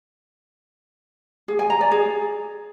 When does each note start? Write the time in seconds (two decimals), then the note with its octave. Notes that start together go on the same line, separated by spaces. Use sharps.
1.48 G#4
1.59 G#5
1.70 A#5
1.81 D5
1.92 G#4